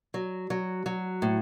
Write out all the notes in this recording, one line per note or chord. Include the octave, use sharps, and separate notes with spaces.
F#3
F#3
F#3
A2